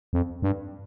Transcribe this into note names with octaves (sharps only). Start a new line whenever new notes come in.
F2
G2